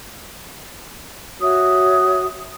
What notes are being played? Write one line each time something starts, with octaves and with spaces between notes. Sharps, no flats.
F#4 C#5 E5 D#6